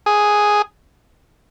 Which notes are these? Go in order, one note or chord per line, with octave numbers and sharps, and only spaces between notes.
G#4